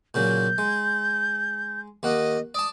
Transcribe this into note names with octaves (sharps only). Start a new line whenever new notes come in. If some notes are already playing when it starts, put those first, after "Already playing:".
A#2 C#3 F#3 G6
G#3
D#2 A#3 D#5 F#5
D5 A5 D#6